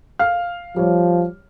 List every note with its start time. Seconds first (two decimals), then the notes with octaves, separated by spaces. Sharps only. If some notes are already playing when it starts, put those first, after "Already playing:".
0.19 F5 F6
0.76 F3 G3 C#5